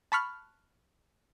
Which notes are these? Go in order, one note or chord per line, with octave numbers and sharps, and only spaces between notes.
A5 B5 C#6 F6 F#6